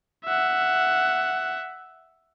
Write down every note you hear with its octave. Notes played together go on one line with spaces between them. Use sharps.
E5 F#5